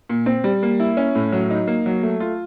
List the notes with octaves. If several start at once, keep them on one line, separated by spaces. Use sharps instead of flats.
A#2
C4
G3
A#3
E4
C#4
A2
F#3
D#4
A#3
F#3
A3
F4